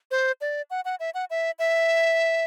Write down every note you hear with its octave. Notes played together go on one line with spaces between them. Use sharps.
C5
D5
F#5
F#5
E5
F#5
E5
E5